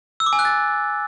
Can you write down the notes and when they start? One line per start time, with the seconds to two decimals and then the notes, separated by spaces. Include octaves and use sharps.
0.20 E6
0.26 D6
0.33 G#5
0.39 F#6
0.45 A6